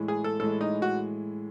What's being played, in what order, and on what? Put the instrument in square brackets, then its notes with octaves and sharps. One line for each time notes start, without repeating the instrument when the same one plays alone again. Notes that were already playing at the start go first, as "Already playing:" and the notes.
Already playing: [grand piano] A2 E3 G#3
[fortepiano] G#4
A4
[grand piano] A2 E3 G#3 [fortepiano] A4
[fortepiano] D#4
F#4